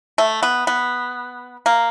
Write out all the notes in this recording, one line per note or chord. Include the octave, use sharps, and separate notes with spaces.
A3
B3
B3
A#3